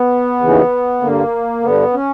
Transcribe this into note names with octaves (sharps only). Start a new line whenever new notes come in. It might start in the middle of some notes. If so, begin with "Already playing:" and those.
Already playing: B3
D#2 C#3 E3
G2 D3 A#3
G2 D3 B3
C#4